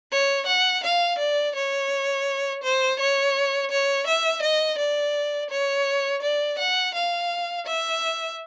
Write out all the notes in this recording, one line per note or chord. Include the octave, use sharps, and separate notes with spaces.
C#5
F#5
F5
D5
C#5
C5
C#5
C#5
E5
D#5
D5
C#5
D5
F#5
F5
E5